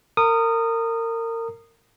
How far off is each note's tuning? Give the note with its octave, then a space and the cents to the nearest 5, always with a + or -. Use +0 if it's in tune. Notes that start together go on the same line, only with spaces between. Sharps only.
A#4 -30 D#6 -15